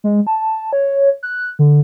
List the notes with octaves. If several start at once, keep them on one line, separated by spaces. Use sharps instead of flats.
G#3
A5
C#5
F#6
D3